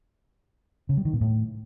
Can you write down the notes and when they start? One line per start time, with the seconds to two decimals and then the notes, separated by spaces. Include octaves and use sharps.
0.89 C#3
0.97 G3
1.05 D#3
1.13 A#2
1.21 A2